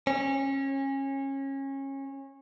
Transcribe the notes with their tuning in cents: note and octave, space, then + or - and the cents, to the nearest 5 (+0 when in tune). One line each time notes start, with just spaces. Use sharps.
C#4 -25